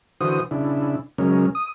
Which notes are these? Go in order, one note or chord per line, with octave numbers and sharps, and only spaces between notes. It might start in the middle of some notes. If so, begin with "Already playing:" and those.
D3 E3 F#4 C5 D#6
C#3 D4 E4
C#3 F#3 G#3 C#4 A#4
D#6